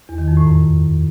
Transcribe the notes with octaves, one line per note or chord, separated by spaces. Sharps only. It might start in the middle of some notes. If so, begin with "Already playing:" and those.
E2
D#3
F2
A2
F#2